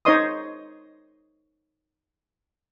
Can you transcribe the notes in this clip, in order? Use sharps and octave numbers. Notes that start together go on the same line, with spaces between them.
D#4 C5 C#5 D#5 C6 D#6